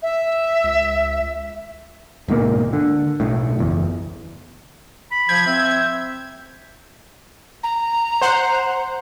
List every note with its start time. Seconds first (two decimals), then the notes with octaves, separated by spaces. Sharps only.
0.02 E5
0.64 C#2
2.28 D1 G#2 B2 A#3
2.73 D3
3.20 B1 A2
3.59 F#1 E2
5.11 B5
5.29 F3 G6 G#6
5.47 C4 E5
7.64 A#5
8.21 C5 F#5